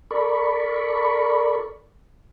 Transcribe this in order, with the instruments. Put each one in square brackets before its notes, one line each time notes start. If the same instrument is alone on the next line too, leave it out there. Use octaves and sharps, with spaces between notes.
[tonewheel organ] A4 A#4 D5 B5 C#6